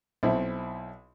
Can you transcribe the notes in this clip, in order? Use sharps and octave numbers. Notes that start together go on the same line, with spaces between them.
B1 C4 E4